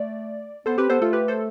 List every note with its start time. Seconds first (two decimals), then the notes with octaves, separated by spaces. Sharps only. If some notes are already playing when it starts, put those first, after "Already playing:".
Already playing: A3 D5
0.66 B3 A4 C5
0.78 C4 G4 B4
0.90 B3 A4 C5
1.01 A3 F4 A4
1.13 G4 B4
1.28 A4 C5